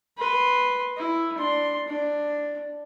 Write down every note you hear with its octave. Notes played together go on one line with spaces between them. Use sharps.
B4 C6
E4
D4 C6
D4